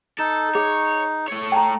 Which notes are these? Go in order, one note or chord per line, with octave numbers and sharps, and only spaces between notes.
D#4 A4
G#4 C#5
A3 C#5
G5 A5 A#5